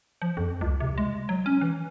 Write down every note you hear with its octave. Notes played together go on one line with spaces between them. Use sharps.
F3
F2
C#2
C3
G#3
F#3
C#4
E3